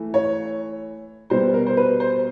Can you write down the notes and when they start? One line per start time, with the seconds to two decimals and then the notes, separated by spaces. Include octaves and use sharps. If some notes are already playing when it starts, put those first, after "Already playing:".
Already playing: E3 A3
0.14 C#5
1.30 B2 G3 B3 C5
1.54 A#4
1.67 C5
1.77 B4
2.00 C5